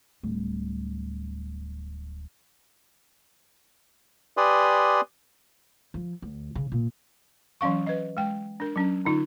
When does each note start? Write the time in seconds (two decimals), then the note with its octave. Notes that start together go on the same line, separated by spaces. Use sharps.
0.23 D1 G3
4.37 G4 B4 D5 G#5 C6 D#6
5.94 F3
6.22 D2
6.55 C#3
6.72 A#2
7.61 E3 F#3 C#4 F5 C#6
7.87 B4 D#5
8.17 G#3 G5
8.60 D4 A#4
8.76 F#3 C#4 A#5
9.05 D3 D#4 F4